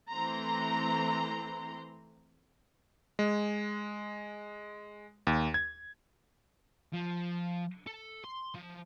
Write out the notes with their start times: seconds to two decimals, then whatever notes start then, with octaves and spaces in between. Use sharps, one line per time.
0.10 E3 A3 C4 A#5 C6
3.19 G#3
5.27 D#2
5.54 G#6
6.93 F3
7.87 A4
8.24 C6
8.55 F3